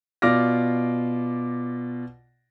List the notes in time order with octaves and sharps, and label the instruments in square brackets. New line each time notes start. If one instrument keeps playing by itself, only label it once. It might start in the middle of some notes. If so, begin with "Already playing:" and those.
[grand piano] B2 F4 D5 D6 F6 A#6